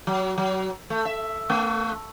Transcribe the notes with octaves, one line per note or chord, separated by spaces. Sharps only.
F#3
F#3
A3
E5
A3